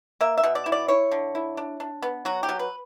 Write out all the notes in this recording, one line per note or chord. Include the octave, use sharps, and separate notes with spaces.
A#3 E5
E5
B2
D5
E4
D5
E4 C#5
D3
E4
D4
D4
B3
F#3 F#4
G4
F#3
B4